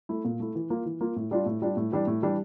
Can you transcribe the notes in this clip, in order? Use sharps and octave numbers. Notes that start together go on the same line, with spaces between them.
A3 E4
A#2
A3 E4
E3
A#3 F4
E3
A#3 F4
A2
G3 D4 F4
A2
G3 D4 F4
A2
E3 G3 D4
A2
E3 G3 D4